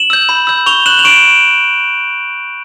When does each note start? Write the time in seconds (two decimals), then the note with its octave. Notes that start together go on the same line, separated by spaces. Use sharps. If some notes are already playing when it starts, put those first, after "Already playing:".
Already playing: E7 F#7
0.10 E6 G6
0.29 B5
0.47 E6 G6
0.66 C#6 F7 G7
0.86 F#6 E7 F#7
0.99 F7
1.04 C#6 D7 E7